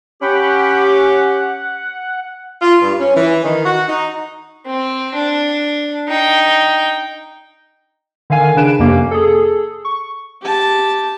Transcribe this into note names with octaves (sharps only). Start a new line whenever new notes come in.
C#4 G4 F#5 G5 B5
F#5
F4
G2
C#4
E3
D#3
F#4
D#4
C4
D4
D#4 G5
D3 D#3 F5 G#5
C#3 D4 B4 D7 E7
F2 C3 A#3 C#4
G#4 A4
C#6
G4 A5